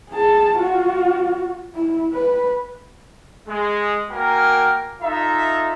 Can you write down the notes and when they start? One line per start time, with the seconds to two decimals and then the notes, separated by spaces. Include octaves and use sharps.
0.10 G#4 A5
0.57 F4 F#4
1.75 E4
2.14 B4
3.48 G#3
4.11 A#3 F#4 A#4 G5 G#5
5.01 D#4 F4 A4 E5 A#5